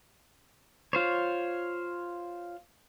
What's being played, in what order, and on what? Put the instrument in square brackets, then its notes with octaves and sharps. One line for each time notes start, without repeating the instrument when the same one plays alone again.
[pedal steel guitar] F4 C5 C#5